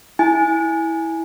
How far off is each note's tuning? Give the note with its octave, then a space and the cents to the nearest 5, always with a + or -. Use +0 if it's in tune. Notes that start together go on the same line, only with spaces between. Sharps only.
E4 -10 G#5 +0